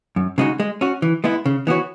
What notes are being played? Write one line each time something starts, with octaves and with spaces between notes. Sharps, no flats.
F#2
C#3 G#3 D#4 F#4
G#3
C#4 F#4
E3
G#3 B3 E4
C#3
E3 B3 F#4 C#5